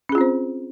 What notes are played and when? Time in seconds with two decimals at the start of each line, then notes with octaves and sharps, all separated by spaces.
0.09 C#4
0.12 G#4
0.15 F4
0.18 C4
0.21 C5